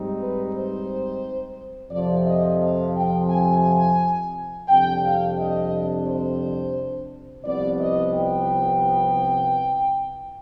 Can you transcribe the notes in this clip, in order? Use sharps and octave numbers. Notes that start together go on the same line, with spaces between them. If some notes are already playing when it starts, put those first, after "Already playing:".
Already playing: G#2 G3 C4 D#4
B4
C5
F2 C3 F3 D5
D#5
F5
G5
G#5
F2 C3 G3 D4 G5
F5
D#5
C5
C2 C3 F3 B3 D5
D#5
G5